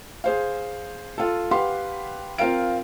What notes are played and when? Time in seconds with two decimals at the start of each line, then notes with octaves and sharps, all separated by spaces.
0.24 G#4 C5 F5
1.18 F4 A4
1.51 G4 B4 F5 F#5 C6
2.38 C4 F4 A#4 F5 D7